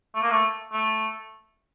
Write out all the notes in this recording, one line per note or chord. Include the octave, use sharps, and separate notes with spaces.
A3
A#3
A3
A3